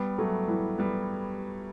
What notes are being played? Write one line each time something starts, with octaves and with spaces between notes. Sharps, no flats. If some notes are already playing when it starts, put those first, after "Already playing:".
Already playing: G3 B3
F#3 A3
E3 G3
G3 B3